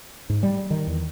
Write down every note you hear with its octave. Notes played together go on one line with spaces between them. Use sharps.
G#2
G3
D#3
E2